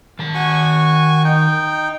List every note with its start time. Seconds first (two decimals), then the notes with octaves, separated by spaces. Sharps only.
0.19 D#3 A5
0.35 F#4 G#5 C#6
1.24 D#4 G5